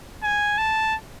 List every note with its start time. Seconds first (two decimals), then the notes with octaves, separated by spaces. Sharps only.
0.23 G#5
0.58 A5